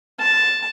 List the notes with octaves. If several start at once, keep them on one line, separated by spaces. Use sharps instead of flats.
A5